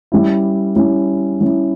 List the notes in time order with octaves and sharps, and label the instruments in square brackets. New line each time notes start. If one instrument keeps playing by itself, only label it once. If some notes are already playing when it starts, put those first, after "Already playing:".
[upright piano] G3 C#4 E4
G3 C#4 E4
G3 C#4 E4